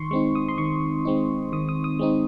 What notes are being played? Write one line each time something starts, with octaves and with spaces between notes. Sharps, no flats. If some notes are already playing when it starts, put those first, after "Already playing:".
Already playing: D#3 C6 C#6
G#3 C4 D#4 C#6
D#6
C6
D#3 C#6
G#3 C4 D#4
D#3 D#6
D#6
D#6
G#3 C4 D#4